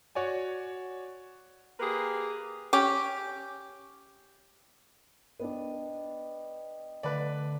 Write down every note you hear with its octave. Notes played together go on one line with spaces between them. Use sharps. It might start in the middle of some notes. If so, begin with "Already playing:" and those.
F#4 C#5 D5 G#5
A#3 G4 G#4 A#4 B4
C#4 G4
B3 D4 D#5 G5
D3 A3 B4 D5